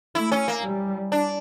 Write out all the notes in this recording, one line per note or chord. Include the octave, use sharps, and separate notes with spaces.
A3 E4
C#4
A#3
G3
D4